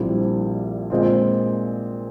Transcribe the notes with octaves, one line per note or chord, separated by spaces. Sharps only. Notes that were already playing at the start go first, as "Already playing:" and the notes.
Already playing: A#1 A#2 G3 C4 E4
A#2 G#3 C4 F4